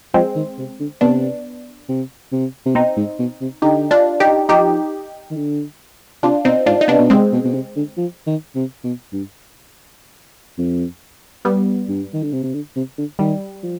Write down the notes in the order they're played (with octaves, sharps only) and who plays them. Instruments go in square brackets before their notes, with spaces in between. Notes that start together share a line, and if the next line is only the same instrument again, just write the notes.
[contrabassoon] F3 [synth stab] G#3 C4
[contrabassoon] D#3
C3
D3
[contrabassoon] C3 [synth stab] B3 D4
[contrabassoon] C3
C3
C3
[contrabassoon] B2 [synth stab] C4 D#4
[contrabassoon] G#2
B2
C3
[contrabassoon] D3 [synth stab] D#4 G4
[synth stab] D4 F4
D#4 G4
[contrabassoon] F3 [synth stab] D#4 G4
[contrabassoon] D#3
D3
[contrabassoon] C3 [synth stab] D4 F4
[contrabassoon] B2 [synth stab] C4 D#4
[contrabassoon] G#2 [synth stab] D4 F4
[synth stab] D#4
[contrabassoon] C3 [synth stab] B3 D4
[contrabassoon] B2
[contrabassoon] C3 [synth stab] G#3 C4
[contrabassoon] B2
B2
C3
D3
F3
D#3
C3
B2
G2
F2
[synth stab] G3 B3
[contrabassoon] G2
D#3
D3
C3
C3
D3
C3
D3
[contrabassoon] D#3 [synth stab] G3
[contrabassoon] F3